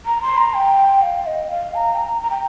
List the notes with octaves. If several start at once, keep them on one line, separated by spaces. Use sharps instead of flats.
A#5
C6
A#5
G5
F5
D#5
F5
A#5
G5
A#5
A#5
G5